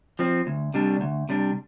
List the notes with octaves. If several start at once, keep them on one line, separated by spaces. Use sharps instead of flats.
F3 C4
D2
C3 G3 D4
D2
C3 G3 D4